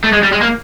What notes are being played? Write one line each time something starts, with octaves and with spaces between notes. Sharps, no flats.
A3
G#3
G3
G#3
A#3